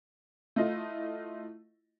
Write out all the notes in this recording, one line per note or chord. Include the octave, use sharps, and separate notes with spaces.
A3 E4 F4 D#5